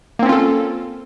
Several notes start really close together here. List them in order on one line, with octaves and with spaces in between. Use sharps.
A#3 C4 C#4 F4 A4